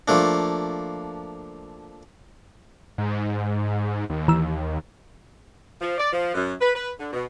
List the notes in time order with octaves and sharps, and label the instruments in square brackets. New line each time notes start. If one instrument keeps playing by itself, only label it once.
[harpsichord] F3 A3 A#3 D4
[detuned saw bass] G#2
D#2
[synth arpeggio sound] E3 E6
[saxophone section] F3
D5
F3
F#2
B4
B4
D3
B2